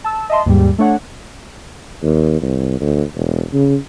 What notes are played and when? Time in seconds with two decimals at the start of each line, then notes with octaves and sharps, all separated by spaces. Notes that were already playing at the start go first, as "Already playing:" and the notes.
0.04 A5 E6
0.30 D#5 E5 A5 C6
0.46 D#2 G#2 G3
0.78 A3 D4 C#5 F#5
2.03 D#2
2.42 C2
2.80 D2
3.16 E1
3.54 C#3